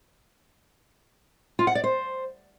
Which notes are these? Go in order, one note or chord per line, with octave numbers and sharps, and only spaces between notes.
F4
F#5
D5
C5